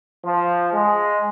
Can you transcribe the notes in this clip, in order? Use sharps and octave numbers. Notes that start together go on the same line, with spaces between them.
F3
G#3